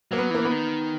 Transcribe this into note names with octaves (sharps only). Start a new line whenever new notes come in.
F#3 A#3
B3
E3 A#3
B3
D#3